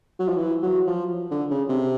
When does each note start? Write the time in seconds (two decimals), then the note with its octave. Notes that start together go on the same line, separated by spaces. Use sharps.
0.19 F#3
0.29 F3
0.37 E3
0.63 F#3
0.87 F3
1.31 D3
1.50 C#3
1.69 C3